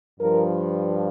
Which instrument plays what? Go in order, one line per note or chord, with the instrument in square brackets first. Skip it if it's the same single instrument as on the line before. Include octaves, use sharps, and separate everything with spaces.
[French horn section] G2 F3 A#4